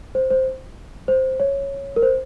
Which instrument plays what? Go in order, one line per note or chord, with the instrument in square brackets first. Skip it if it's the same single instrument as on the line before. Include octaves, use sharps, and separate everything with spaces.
[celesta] C5
C5
C5
C#5
A#4
C5